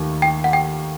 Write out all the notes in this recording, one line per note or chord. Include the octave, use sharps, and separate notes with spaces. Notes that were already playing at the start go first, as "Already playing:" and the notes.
Already playing: D#2 D#3 A3
G5
F#5
G5